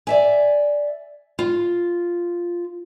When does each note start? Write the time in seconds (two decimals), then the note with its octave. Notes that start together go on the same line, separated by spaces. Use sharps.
0.07 D5 E5 G#5
1.39 F4